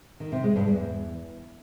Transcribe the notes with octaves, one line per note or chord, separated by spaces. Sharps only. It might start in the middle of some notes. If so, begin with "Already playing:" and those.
D#3
C3
G#3
G2
E2